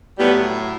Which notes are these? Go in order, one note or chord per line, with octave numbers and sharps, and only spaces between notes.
A2 F#3 G3 B3